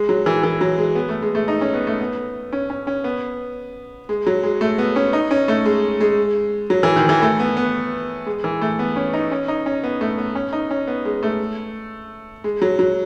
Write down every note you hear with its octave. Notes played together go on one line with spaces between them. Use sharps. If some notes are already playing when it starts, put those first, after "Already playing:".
Already playing: G#3
F#3
E3
E3
F#3
G#3
B3
A3
G#3
A3
D#4
C#4
B3
A3
B3
C#4
C#4
C#4
B3
G#3
F#3
G#3
A3
B3
C#4
D#4
C#4
A3
G#3
G#3
F#3
E3
D#3
E3
A3
B3
B3
G#3
E3
A3
B3
C#4
D#4
C#4
D#4
C#4
B3
A3
B3
C#4
D#4
C#4
B3
G#3
A3
G#3
F#3
F#3